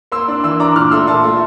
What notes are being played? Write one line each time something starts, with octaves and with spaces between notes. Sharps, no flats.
A#3 C6 E6
D4
E3 C6 E6
D4 A#5 D6
A#2 D6 F6
A3 C6 E6
A#2 A5 C6
A3